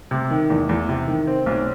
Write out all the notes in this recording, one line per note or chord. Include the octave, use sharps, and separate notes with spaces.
C3
D#3
E2
E2
C3
D#3
C4
B1